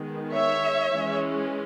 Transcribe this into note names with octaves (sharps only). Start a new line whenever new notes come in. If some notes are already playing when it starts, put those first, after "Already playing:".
Already playing: D#3 G#3 B3
C#5 E5
E3 G#3 C#4